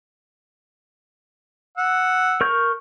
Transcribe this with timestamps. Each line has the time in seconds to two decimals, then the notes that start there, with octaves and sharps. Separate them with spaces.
1.77 F#5 E6
2.41 A#4 C#6 G6